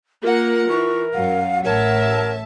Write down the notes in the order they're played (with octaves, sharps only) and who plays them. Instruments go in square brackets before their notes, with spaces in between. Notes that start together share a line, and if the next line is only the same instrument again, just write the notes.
[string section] A#3 F#5 [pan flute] F4 [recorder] A#4
[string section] E3 [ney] C#6
[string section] F#2 F#3 [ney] F5 [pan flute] F#5
[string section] A1 E5 A5 [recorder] A#4 [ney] C#5